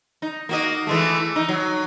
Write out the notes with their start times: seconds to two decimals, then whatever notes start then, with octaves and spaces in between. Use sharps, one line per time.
0.22 D#4
0.49 A#3 F#4 D#5
0.87 E3 G#3 A3
1.36 D#4
1.49 F#3